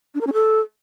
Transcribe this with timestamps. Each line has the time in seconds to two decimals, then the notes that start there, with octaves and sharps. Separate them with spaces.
0.14 D4
0.21 A#4
0.27 C#4
0.33 A4